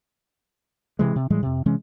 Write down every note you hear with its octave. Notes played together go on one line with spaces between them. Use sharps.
C3 E3 G#3
C3
A2 E3 G3 G#3
F2 C3
C3 E3 G#3 C#4